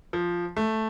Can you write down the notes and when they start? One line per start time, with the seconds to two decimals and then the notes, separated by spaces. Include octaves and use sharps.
0.13 F3
0.57 A3